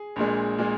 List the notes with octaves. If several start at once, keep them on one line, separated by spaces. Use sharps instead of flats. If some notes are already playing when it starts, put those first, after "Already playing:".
Already playing: G#4
A#1 A#2 G#3
A#2 G#3